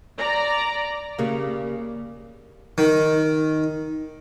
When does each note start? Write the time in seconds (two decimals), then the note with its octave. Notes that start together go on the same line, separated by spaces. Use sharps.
0.18 D5 A#5
1.19 C#3 G3 A#3
2.78 D#3